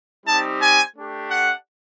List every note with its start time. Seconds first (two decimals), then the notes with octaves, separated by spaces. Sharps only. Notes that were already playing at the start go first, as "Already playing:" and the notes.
0.25 G3 C4 D#4 G4 A5
0.60 G#5
0.95 A3 D4 G4
1.30 F#5